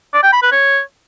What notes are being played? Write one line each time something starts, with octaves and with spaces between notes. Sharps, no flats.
D5
G5
B5
B4
C#5